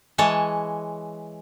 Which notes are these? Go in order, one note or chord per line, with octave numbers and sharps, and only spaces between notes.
E3 G#3 C#5 A5